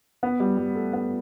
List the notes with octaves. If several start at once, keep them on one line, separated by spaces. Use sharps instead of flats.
B3
G3
G3
A3
B3